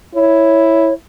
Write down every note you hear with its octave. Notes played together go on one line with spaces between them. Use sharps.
E4 C#5